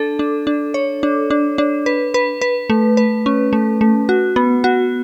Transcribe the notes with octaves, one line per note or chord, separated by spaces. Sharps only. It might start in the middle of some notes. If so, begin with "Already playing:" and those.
Already playing: D4 A4
D4
D4
C#5
D4
D4
D4
B4
B4
B4
A3
B4
C#4
A3
A3
F#4
B3
F#4